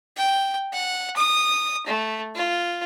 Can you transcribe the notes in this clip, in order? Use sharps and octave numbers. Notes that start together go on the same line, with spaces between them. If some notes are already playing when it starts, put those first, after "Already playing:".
G5
F#5
D#6
A3
F4